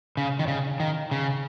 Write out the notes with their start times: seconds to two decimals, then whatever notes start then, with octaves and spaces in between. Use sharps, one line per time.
0.17 C#3
0.39 D#3
0.48 C#3
0.80 D#3
1.11 C#3